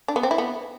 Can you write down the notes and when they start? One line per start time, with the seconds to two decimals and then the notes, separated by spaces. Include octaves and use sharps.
0.08 D4
0.16 B3
0.23 C4
0.31 E4
0.38 B3